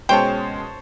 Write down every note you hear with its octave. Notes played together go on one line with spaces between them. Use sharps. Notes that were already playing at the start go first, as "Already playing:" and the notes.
B2 G#3 C#4 C5 C#5 G5 A5